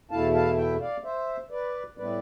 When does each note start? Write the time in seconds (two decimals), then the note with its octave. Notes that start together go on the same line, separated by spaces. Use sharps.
0.11 E2 B2 A3 E4 F5 A5
0.34 F5 A5
0.57 E5 G5
0.81 D5 F5
1.04 C5 E5
1.51 B4 D5
1.97 A2 G3 B3 E4 B4 D5